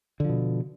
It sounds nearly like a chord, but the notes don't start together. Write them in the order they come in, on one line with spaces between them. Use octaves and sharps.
D3 F3 B2